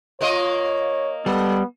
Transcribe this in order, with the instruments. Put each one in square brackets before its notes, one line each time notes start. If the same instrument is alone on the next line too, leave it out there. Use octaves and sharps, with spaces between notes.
[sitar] A#3 F4 D#5 [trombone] C#5
[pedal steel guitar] G3 [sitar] G#3 A4 [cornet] B3